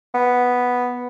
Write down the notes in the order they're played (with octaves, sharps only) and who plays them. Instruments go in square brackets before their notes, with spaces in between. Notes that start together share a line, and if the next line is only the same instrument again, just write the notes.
[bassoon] B3